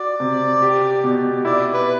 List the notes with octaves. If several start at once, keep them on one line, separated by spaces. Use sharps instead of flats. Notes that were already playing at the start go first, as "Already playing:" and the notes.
Already playing: F#4 D5
C3
G4
B2
E4 D5
B4